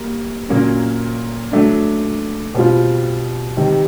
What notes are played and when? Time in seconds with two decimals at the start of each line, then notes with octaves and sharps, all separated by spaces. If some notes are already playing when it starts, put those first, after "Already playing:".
Already playing: G3 A#3
0.49 A#2 F#3 A#3 C#4
1.52 F#3 A3 D4
2.54 B2 G3 C4 F4
3.57 C3 D#3 G3